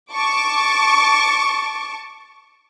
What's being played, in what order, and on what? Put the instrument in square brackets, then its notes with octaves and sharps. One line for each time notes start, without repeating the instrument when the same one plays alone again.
[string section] A5 C#6 D6